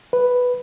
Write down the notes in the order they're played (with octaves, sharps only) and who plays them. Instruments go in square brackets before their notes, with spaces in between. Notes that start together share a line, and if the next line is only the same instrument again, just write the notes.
[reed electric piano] B4